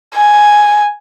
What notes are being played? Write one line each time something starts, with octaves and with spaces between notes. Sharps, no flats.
G#5